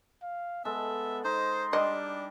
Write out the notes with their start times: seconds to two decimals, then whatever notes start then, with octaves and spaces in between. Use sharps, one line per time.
0.23 F5
0.65 G#3 B3 A4 E5
1.25 D#4 C5 C6
1.73 G3 D4 D#5